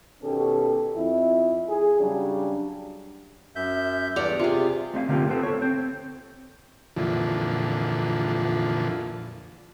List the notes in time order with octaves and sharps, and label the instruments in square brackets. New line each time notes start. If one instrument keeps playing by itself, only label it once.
[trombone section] B2 D#3 B3 C#4 G4 A4
F2 E4
G#4
C#3 F#3 G3 D4
[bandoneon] F#2 E5 G6
[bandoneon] E2 G2 [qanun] D5 F#5 A#5
[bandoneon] C3 [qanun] F4 G#4
[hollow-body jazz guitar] A3 C4 E5 F5
D3 A3 A#3 C4 F4 G4
B3 C4 A4
A4 C#5
C4
[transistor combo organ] F2 A#2 D3 E3 F3